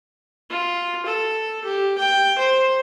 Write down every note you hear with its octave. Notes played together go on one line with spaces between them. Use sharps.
F4
A4
G4
G5
C5